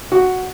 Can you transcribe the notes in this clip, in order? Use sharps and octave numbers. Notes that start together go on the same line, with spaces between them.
F#4